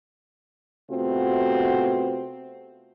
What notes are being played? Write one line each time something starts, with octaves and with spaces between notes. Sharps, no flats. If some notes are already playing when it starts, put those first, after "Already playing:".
C3 A3 B3 C4 F4 F#4